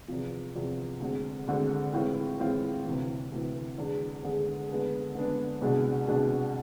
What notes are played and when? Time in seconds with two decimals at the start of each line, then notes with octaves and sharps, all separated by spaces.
0.08 E2 C3 F3
0.55 E2 C3 F3
1.00 D2 D3 G#3 C4
1.47 D2 D3 G#3 C4
1.93 A2 E3 G#3 C4 F4
2.39 A2 E3 G#3 C4 F4
2.85 D2 C3 E3
3.32 D2 C3 E3
3.77 E2 D3 G#3 D4 G#4
4.23 E2 D3 G#3 D4 G#4
4.69 D3 G#3 B3 D4 G#4
5.15 D3 G#3 B3 D4 G#4
5.61 C2 B2 G#3 D4 G#4
6.07 C2 B2 G#3 D4 G#4